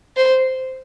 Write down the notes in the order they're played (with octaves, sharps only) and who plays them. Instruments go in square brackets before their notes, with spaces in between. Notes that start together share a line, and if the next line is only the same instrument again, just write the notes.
[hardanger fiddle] C5